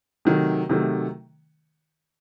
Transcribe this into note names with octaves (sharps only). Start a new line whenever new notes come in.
C3 D#3 F#3 A3
C3 D#3 F#3 A3